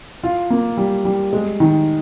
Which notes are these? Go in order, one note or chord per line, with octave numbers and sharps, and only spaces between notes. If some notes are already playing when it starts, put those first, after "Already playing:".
F4
A#3
G3
G3
G#3
D#3